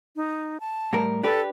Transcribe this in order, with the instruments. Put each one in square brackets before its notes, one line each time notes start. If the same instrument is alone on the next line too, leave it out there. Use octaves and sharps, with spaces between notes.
[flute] D#4
A5
[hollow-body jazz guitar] A2 G3 A#4
[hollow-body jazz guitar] D4 G4 B4 [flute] A4